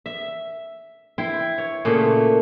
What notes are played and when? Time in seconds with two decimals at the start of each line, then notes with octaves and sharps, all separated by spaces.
0.06 E5
1.18 E4 G5 C6
1.58 C#5
1.85 A#2 C#3 A3